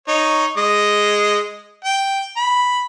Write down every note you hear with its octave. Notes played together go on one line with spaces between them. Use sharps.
D#4 C#5
G#3 D#5
G5
B5